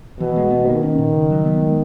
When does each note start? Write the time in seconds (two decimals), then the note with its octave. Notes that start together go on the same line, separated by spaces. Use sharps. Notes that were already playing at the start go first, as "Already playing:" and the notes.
0.19 B2 E3
0.36 G#3
0.51 B3
0.67 D#3 A#3
0.83 C#4
0.98 A#2
1.14 C#3
1.30 F#3
1.45 B3
1.61 G#3